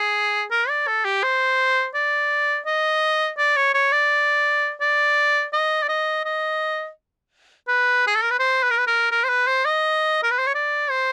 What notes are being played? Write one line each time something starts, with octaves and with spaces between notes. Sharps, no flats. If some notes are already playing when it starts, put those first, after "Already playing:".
Already playing: G#4
A#4
D5
A4
G4
C5
D5
D#5
D5
C#5
C#5
D5
D5
D#5
D5
D#5
D#5
B4
G#4
A4
A#4
B4
C5
B4
A#4
B4
A#4
A#4
C5
B4
C5
D#5
A#4
B4
C5
C#5
D5
C5